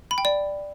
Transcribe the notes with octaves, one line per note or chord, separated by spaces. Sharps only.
B5
G5
D5